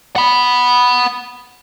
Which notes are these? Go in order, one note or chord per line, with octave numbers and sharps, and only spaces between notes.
F#5 B5